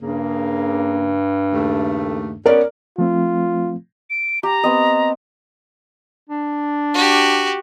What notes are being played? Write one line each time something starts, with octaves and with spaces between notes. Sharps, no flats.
G2 C#3 A#3
D#2 C#3 A3
B3 C#4 A#4 D5
F3 A3 C4 F4
D7
G4 A#5
B3 C4 D#5
D4
F#4 G4